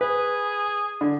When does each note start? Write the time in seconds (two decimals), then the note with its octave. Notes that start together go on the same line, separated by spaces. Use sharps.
0.01 G#4 B4
1.01 D3